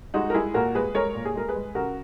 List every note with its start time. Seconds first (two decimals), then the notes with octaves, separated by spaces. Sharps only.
0.14 G#3 D#4 F#4
0.30 A#4
0.34 G#3 E4 G#4
0.54 A#2 F#4 A#4
0.75 G#3 G#4 B4
0.94 G#3 A#4 C#5
1.15 A#2
1.25 G#4
1.35 G#3 A#4
1.48 G#4 B4
1.55 G#3
1.75 C#3 F#4 A#4